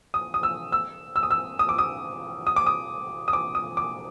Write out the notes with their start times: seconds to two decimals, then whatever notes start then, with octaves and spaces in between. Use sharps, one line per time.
0.14 D#6
0.34 D#6
0.43 E6
0.72 E6
1.16 E6
1.23 D#6
1.31 E6
1.59 D#6
1.69 D6
1.78 D#6
2.47 D#6
2.56 D6
2.67 D#6
3.28 D#6
3.33 D6
3.55 D#6
3.77 D6